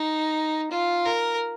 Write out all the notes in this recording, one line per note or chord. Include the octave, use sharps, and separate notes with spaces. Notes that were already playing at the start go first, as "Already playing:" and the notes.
Already playing: D#4
F4
A#4